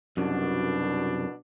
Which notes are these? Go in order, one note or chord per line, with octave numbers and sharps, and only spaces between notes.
C2 F#2 B2 D4